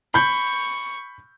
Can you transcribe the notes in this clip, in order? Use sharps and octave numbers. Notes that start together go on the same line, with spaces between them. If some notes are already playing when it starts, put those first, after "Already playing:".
B5 C#6 G6